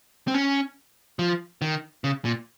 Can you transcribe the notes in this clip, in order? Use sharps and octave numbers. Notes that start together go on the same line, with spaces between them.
C4
C#4
F3
D#3
C#3
A#2